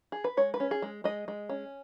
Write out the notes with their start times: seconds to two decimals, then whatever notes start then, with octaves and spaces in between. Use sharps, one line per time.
0.12 G#4
0.24 B4
0.37 G#3 C#5
0.54 B4
0.60 C#4
0.71 G#4
0.82 G#3
1.04 G#3 D#5
1.28 G#3
1.49 C#4